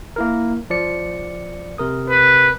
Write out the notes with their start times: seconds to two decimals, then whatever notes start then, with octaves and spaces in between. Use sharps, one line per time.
0.16 A#3 E4 A#4
0.70 F3 D5 C#7
1.78 C3 A#4 D#6
2.09 B4